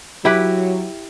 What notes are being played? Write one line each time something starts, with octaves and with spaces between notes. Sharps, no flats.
F#3 E4 G4 B4